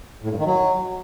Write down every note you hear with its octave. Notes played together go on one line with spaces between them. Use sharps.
A2
G2
D#3
F#3